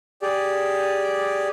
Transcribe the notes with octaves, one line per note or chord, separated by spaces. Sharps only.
G4 G#4 D5